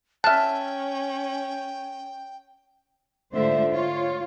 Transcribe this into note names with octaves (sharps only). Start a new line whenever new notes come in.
C#4 E5 G5 A5 F6 F#6
G#2 D3 A3 F4 C5 E5
F4 C#5